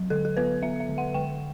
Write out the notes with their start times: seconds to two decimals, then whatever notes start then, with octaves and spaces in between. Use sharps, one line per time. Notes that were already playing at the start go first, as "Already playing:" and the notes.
Already playing: F#3
0.10 D3 A4
0.25 A4
0.37 B3 B4
0.63 B3 E5
0.80 E5
0.89 D3
0.98 F#5
1.14 D3 G5